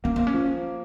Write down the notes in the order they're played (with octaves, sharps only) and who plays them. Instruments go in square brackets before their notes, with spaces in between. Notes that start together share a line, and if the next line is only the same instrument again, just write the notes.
[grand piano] A#3 [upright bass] C#4
[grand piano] A#3 [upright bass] C4
[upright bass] C#4
[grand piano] F3